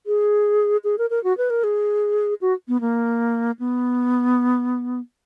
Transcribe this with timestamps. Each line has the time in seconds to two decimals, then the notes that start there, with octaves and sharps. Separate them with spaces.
0.06 G#4
0.84 G#4
0.98 A#4
1.10 A#4
1.24 F#4
1.37 B4
1.50 A#4
1.64 G#4
2.41 F#4
2.68 B3
2.81 A#3
3.59 B3